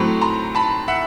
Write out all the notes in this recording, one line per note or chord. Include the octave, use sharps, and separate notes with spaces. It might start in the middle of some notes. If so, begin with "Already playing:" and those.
Already playing: A2 F#3 A3 C4 B5 C#6
A#5 C6
A5 B5
E5 F#5